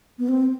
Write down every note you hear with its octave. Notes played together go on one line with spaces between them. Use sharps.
B3
C4